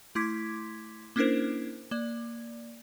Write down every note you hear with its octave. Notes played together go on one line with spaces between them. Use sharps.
A3 E4 C6 D6 G#6 B6
A#3 C#4 D4 E4 A#4 C5
A#3 D5